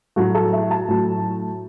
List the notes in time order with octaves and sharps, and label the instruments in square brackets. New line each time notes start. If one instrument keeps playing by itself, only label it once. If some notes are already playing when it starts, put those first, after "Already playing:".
[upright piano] A2 F#3 A3 F#4
A4
E5
A5
A2 F#3 A3